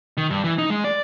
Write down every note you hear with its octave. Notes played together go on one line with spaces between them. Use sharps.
D#3
G2
E3
D#4
G#3
D5